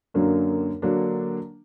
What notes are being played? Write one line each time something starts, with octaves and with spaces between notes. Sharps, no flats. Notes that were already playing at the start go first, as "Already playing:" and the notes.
F#2 D3 F#3 A#3 D4
D3 F#3 A#3 D4